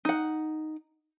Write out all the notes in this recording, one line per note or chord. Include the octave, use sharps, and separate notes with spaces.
D#4 F#5